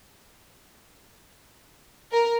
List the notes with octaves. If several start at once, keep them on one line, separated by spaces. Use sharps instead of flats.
A#4